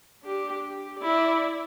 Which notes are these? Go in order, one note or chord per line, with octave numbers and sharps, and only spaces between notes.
D4 G4
G4
E4 D5